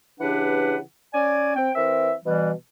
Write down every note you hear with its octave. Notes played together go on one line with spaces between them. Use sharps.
C#3 E3 D4 G4 B4 F#5
C#4 D5 G#5
C4 G5
E3 C4 A#4 E5
B2 E3 G3